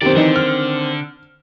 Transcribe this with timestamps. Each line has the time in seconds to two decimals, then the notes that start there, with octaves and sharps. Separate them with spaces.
0.02 F#2 D#3 C4 G4 D5
0.16 D3 E3 D#4 C5
0.36 F6